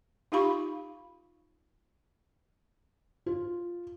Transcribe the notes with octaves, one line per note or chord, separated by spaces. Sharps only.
D#4 F4 G4 F5 B5 C#6
F4